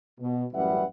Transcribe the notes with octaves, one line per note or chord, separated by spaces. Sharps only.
B2
A1 F#2 G3 B4 E5 F#5